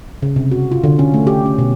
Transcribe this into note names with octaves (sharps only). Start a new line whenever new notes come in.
C#3
C3
F#4
F4
D3
C#4
A3
G4
C#4
B2